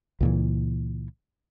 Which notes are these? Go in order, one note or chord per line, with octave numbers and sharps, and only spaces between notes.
C#2 A#2 E3